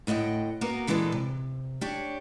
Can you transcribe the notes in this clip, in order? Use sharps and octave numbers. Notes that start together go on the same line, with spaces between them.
D2 A2 D#5 F#5 G5
A#3 B3 F#4 A#4
A#2 E3 G#3 B3 D4 A4
C3
D4 G4 C#5